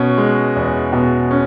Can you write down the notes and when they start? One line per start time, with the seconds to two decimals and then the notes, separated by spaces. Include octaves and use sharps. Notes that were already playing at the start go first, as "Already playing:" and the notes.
Already playing: B2 C#4
0.18 G#3
0.56 E2
0.93 B2
1.31 C#4